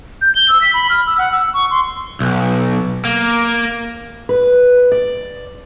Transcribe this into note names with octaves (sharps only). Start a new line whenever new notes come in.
G6
G7
E6
B6
B5
F6
E6
F#5
E6
C#6
C6
B1
A#3
B4
D5